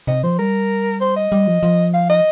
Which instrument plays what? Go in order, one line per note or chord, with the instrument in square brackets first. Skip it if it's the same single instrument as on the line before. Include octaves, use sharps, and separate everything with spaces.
[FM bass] C3 [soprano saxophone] D#5
[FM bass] F3 [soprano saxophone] C5
[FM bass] G3 [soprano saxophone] A#4
[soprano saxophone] C5
D#5
[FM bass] G3
F3
F3
[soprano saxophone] F5
D#5